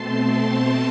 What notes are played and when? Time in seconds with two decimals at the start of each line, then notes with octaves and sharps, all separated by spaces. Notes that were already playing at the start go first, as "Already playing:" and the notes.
Already playing: B2 A3 C4 A5 C6
0.44 A5 C6